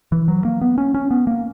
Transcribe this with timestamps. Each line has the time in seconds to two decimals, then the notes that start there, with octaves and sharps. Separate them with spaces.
0.12 E3
0.28 F#3
0.45 A#3
0.61 B3
0.78 C#4
0.94 C#4
1.11 B3
1.27 A#3